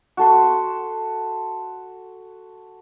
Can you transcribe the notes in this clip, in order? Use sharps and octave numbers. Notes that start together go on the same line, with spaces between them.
F#4 A4 A5 C6